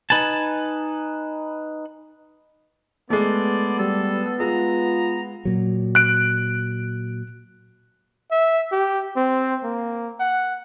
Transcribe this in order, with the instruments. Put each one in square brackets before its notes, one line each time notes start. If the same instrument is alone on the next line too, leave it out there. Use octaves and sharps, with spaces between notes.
[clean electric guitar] D#4 B4 G#5 A5
[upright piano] G#3 A3 [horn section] B3 [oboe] D5
[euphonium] G3 [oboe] A4
[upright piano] G#3 [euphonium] F4 [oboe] A#5
[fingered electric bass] A#2 F#3
[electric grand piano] F#6 D7
[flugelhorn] E5
G4
C4
A#3
F#5